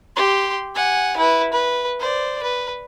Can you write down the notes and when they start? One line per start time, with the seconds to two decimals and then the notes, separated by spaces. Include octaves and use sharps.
0.16 G4 C6
0.75 F#5 G#5
1.17 E4 B4
1.53 B4
2.00 C5 D5
2.43 B4